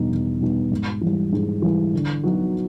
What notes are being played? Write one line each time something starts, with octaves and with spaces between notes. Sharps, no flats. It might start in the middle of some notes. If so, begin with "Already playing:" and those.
Already playing: E2 B2 G3 B3 D#4
E2
B2 G3 B3 D#4
G#2
E3 G3
G#2
E3 G3
D3
F#3 B3 D#4 F#4